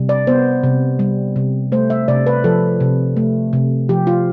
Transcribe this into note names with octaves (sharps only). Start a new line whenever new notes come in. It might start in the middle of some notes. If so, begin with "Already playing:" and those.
Already playing: C3 G3
D5
B3 C5
C3
G3
C3
A3 C5
E5
C3 D5
B4
F3 A4
C3
A3
C3
F3 G4
F4